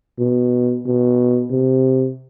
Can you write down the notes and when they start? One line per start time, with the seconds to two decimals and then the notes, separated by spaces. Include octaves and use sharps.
0.19 B2
0.86 B2
1.51 C3